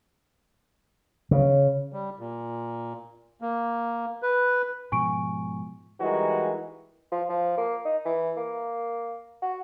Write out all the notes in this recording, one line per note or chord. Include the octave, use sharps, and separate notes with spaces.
C#3
G3
A#2
A#3
B4
G#2 B2 F3 G#5 C#6 D7
E3 G3 G#3 D#4 F#4 A#4
F3
F3
A#3
D#4
E3
A#3
F#4